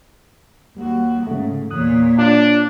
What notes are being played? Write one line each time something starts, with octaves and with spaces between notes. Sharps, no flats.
D#2 G3 F#4
G#2 C#3 A3
E2 A#2 C#5 D#6 F#6
D4 F4